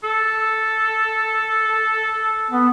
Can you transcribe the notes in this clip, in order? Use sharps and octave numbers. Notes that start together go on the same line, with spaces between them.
A4
B3